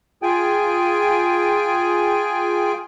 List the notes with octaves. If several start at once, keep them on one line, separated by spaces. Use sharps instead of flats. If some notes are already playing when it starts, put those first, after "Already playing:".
F4 G#4 G5 G#5